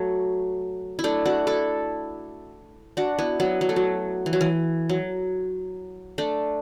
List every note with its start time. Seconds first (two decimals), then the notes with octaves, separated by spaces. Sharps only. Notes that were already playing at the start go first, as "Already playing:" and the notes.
Already playing: F#3 A3
0.99 E4
1.04 A3 D4
1.26 D4 F#4
1.47 E4 A4
2.97 D4 F#4
3.19 B3 E4
3.40 F#3 B3
3.61 F#3
3.69 A3
3.76 F#3
4.26 E3
4.33 F#3
4.41 E3
4.89 F#3
6.18 A3 D4